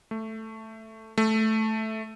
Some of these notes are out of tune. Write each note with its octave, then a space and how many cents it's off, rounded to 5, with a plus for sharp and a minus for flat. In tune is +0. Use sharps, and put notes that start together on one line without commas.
A3 +5
A3 -5